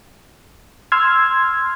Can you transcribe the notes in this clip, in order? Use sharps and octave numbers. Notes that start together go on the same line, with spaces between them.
C6 E6 F6 G#6